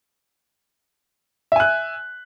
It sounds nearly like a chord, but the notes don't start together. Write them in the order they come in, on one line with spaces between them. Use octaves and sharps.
E5 G#5 F#6